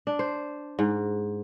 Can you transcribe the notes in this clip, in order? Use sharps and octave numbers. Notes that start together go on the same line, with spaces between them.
D4
C5
G#2